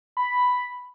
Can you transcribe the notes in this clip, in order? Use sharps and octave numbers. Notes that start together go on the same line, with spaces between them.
B5